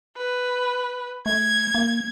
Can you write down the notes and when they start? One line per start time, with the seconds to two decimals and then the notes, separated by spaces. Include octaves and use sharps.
0.17 B4
1.26 A3 G#6
1.75 A#3